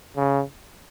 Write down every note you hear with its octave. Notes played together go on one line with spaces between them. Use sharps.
C#3